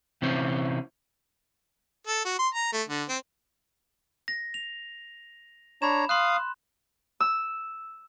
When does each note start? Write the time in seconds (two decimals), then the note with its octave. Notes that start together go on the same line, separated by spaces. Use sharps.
0.22 C3 E3 C4 C#4
2.07 A4
2.25 F#4
2.39 C6
2.54 A#5
2.73 A3
2.89 D3
3.09 C4
4.28 A#6
4.54 F7
5.82 D4 C#5 A#5 B5 E7
6.09 F5 C6 D#6 F#6
7.20 E6